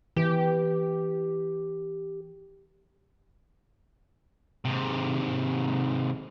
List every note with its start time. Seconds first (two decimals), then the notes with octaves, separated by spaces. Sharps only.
0.17 E3 G4
4.65 G#2 C3